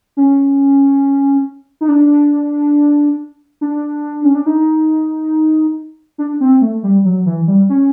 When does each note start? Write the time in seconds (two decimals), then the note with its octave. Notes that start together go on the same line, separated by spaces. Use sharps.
0.17 C#4
1.81 D#4
1.88 D4
3.61 D4
4.24 C#4
4.35 D4
4.46 D#4
6.18 D4
6.40 C4
6.61 A3
6.83 G3
7.05 F#3
7.26 E3
7.47 G3
7.69 C#4